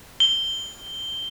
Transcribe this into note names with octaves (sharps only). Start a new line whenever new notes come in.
G7